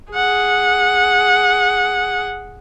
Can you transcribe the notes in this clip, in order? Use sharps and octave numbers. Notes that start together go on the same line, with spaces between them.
G#4 F#5